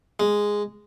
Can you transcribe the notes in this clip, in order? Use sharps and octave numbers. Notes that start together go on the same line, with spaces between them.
G#3